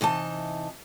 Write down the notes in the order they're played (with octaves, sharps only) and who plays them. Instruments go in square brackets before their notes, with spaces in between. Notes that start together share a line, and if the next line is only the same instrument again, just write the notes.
[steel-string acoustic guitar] C3 E3 D#4 A5